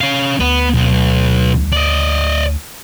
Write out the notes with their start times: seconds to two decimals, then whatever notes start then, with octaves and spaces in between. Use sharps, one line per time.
0.01 C#4 F5
0.40 D2 B3
0.74 B1
1.72 D5 D#5